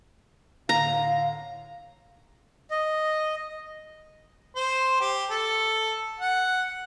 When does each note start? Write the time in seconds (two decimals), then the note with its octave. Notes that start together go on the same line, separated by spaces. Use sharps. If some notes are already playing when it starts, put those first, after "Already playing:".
0.69 A2 D3 F5 A#5
2.71 D#5
4.55 C5
5.00 G4
5.30 A4
6.20 F#5